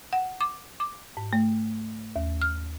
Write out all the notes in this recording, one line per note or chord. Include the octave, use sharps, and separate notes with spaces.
F#5
D6
D6
G#2
A3
D#2
F6